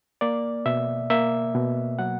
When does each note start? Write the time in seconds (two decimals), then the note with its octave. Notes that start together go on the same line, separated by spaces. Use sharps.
0.21 A#3 D5
0.66 B2 E5
1.10 A#3 E5
1.55 B2
1.99 F#3 F#5